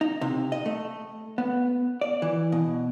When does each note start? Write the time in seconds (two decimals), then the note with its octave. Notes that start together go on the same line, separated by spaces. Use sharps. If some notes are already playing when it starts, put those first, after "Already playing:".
0.01 D#4
0.21 C3
0.52 D#5
0.66 A3
1.38 B3
2.01 D5
2.22 E3
2.52 B2